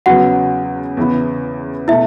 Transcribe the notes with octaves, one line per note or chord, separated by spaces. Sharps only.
E2 C#3 F#3 B3 F#4 F#5
E2 C#3 E3 B3 E4
B2 A3 E4 E5